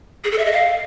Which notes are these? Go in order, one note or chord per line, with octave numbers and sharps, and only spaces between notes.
G#4
A4
E5
D#5
F5